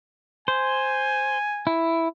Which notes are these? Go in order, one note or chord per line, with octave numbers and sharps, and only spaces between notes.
C5 G#5
E4